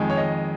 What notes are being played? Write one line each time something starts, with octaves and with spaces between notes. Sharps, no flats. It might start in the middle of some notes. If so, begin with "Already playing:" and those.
Already playing: F2 D#3 G#3
C#5
D#5